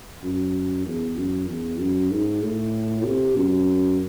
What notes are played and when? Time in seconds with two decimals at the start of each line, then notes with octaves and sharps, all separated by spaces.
0.23 F#2
0.86 E2
1.17 F#2
1.49 E2
1.80 F#2
2.11 G#2
2.42 A2
3.05 C3
3.37 F#2